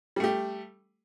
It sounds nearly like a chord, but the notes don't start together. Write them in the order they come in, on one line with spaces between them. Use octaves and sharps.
G3 A3 G4